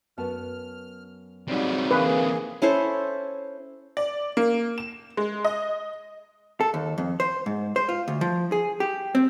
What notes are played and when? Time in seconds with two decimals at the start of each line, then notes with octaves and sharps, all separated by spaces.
0.18 F#2 B3 A5 F6
1.48 G#2 C3 F#3 G3 D#4
1.91 D3 E3 A#3 G#4 B4
2.62 C#4 E4 A4 C5
3.97 D5
4.37 A#3
4.78 E7
5.17 G#3
5.45 D#5
6.61 A4
6.74 D#2
6.98 F2
7.20 C5
7.46 G#2
7.76 C5
7.89 F4
8.08 D2
8.21 F3
8.52 G#4
8.80 G4
9.15 C4